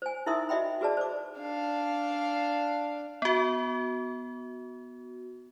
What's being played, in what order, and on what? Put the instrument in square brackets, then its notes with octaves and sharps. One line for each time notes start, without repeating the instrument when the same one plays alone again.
[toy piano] C5 G#5
D#4 E4 A#4 E5 C6 D#6
F#4 D#5 E5 G5 B5
F#4 G#4 B4 D5 A5
C5 D6
[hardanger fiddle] D4 F5
[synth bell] B3 F#4